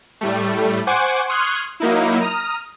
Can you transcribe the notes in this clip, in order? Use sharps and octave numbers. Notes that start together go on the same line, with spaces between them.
A2 G3 A3
C5 F#5 G#5 C#6 D6
C6 C#6 D#6 F6 F#6 G#6
F#3 A#3 D#4 E4
A#5 D#6 F6